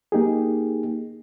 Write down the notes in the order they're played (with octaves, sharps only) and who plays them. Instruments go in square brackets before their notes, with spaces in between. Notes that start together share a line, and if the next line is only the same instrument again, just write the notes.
[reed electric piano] A#3 D#4 G4 G#4